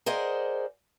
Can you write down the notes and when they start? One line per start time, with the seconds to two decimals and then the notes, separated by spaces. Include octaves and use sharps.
0.06 G#4 A#4 C5 D5 D#5 F#5